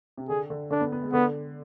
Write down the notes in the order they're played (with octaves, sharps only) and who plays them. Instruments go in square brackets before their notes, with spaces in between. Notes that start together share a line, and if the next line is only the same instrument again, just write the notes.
[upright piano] C3
[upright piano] D3 [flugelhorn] G#4
[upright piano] D3
[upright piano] D3 [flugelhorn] D4
[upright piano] B3
B3
G#3
[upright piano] D3 [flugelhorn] B3